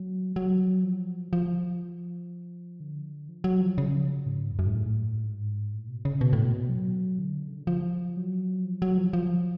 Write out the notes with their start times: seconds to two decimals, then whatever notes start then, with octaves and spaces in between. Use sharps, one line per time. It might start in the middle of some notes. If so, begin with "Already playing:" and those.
Already playing: F#3
0.36 F#3
0.84 F3
1.33 F3
2.80 D3
3.29 F3
3.44 F#3
3.61 F3
3.78 C#3
4.26 G#2
4.51 F2
4.59 F#2
4.67 G#2
4.75 A2
5.24 G#2
5.73 A2
5.88 B2
6.05 C#3
6.21 B2
6.33 A2
6.44 B2
6.69 F#3
7.19 D3
7.48 C#3
7.57 D3
7.67 F3
8.17 F#3
8.65 F3
8.82 F#3
8.97 F3
9.13 F3